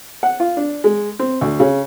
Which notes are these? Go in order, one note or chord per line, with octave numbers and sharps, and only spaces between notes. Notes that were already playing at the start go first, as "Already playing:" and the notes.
F#5
F4
D4
G#3
C4
D2
C#3